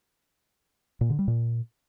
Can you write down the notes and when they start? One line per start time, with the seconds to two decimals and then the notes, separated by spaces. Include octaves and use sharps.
1.01 A#2
1.10 D3
1.19 G3
1.28 A#2